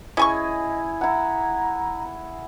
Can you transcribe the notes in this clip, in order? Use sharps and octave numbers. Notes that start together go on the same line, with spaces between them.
C#4 E4 G#4 D#5 G#5 C#6
E4 F#5 A#5